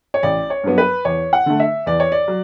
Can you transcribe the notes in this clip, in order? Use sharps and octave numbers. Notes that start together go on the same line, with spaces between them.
C#5
A1 D5
C#5
G2 F#3 B3
B4
E2 C#5
F#5
D3 A3
E5
E2 D5
C#5
D5
F#3